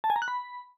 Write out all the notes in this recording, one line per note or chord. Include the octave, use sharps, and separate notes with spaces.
A5
G#5
A#5
F#6
B5